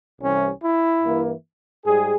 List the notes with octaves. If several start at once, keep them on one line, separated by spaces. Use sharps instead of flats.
C2 C3 E3 G3 C#4
E4
G2 E3 A#3
G#2 G3 G#4